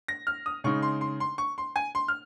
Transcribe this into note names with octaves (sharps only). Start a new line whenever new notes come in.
A#6
F6
D#6
C#3 G#3 D#4 C#6
C6
C6
C6
C#6
C6
G#5
C6
F6